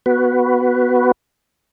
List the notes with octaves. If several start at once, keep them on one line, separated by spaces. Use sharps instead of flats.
B3 F#4 B4